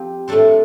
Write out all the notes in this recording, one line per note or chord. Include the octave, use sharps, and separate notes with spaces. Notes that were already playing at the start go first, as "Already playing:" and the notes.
Already playing: F3 C4 G4
A2 A3 D4 A4 C5